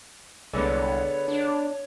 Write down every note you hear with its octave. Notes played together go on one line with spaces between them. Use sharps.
C2 D3 G#3 B3 C#5
D4